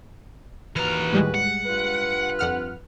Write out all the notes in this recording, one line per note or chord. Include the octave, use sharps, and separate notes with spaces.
D#2 E3 F#4 B4 A#5 F6
A2 G3 G#3
F#5
G2 F4 B4
F2 F#5 F6